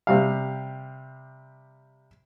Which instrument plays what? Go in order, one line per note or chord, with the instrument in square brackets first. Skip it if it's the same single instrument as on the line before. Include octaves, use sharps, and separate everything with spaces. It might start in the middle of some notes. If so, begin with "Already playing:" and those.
[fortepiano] C3 G3 F5